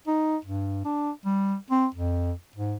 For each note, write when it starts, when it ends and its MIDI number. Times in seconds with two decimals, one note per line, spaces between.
0.07 0.37 63
0.45 0.81 43
0.85 1.11 62
1.25 1.55 55
1.71 1.87 60
1.95 2.32 41
2.56 2.76 44